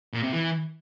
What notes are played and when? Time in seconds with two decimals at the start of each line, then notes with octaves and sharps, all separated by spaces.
0.13 A#2
0.23 C3
0.33 E3